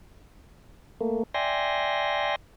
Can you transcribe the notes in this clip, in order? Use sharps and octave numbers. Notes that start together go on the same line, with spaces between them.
A3 A#3
D5 E5 G5 G#5 C6 A#6